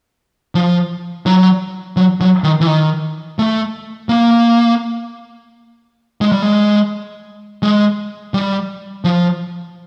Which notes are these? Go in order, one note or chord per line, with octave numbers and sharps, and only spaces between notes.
F3
F#3
F#3
F#3
D#3
E3
D#3
A3
A#3
G#3
G3
G#3
G#3
G3
F3